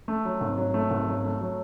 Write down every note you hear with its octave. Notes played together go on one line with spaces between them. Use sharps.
A3
F#3
G#1
F#3
A3
G#1
F#3
A3
F#3